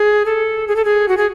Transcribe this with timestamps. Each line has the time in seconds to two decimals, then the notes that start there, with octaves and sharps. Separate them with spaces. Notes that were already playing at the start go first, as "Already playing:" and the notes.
Already playing: G#4
0.26 A4
0.68 G#4
0.76 A4
0.85 G#4
1.08 F#4
1.17 G#4